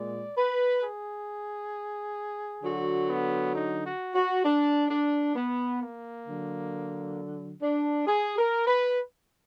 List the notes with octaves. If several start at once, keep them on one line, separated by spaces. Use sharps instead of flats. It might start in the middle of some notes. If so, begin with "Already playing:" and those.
Already playing: A#2 G#3 D5
B4
G#4
D3 F#3 F#4
B3
D#4
F#4
F#4
D4
D4
B3
A#3
D3 F#3
D4
G#4
A#4
B4